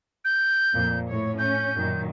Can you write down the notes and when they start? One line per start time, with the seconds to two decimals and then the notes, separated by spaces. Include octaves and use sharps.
0.25 G6
0.74 F2 A#2
1.08 A2 C#5
1.39 C#4 G6
1.76 F#2 A#2 D#3